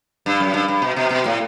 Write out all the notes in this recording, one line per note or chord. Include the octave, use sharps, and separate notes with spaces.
G2
F#2
G2
G2
B2
B2
B2
A2